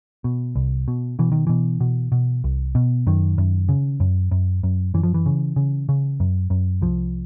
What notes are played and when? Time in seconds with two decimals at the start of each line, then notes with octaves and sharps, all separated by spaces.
0.24 B2
0.56 C2
0.88 B2
1.19 B2 E3
1.32 D#3
1.47 B2 E3
1.80 B2
2.12 B2
2.44 C2
2.75 B2
3.07 F#2 D#3
3.38 F#2
3.69 C#3
4.00 F#2
4.31 F#2
4.63 F#2
4.94 F#2 E3
5.03 F3
5.14 E3
5.26 C#3
5.56 C#3
5.89 C#3
6.20 F#2
6.50 F#2
6.81 C2 F3